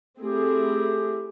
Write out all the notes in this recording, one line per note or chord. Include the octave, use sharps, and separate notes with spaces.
A3 C4 E4 G4 G#4